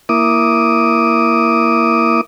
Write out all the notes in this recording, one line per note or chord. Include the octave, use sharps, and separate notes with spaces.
A#3 E4 D6 D#6